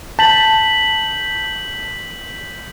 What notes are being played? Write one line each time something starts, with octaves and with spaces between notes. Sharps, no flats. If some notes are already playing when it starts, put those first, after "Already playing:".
A5 G6 B6 F#7